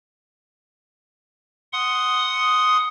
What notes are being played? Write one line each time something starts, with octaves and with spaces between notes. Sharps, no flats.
F#5 C6 D#6